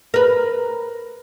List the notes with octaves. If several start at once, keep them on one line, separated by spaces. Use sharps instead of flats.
A#4 B4